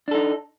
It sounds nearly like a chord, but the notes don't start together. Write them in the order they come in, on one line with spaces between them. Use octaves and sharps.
D4 A4 D#4